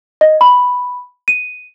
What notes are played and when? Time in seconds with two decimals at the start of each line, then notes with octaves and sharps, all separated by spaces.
0.21 D#5
0.41 B5
1.28 D#7